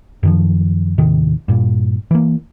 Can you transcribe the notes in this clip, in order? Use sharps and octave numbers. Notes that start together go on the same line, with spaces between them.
F#2 D#3 F3
D#2 A2 C3 D#3
G2 A#2
E3 A#3